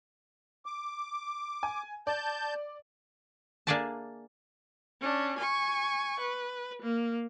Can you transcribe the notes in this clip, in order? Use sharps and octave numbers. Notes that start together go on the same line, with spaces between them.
D6
G#5
D5 A5 G6
A#3 D4 G#4 D5 E5 A5
C#4 D4
G#5 C#6
B4
A#3